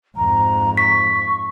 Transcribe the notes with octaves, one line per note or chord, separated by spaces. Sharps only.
F2 G#2 A#5
C#6 B6